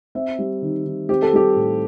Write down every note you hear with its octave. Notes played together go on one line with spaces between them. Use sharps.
C4 E5
G3
D#3
D#3
C4 G4
A4
G3 G4
A2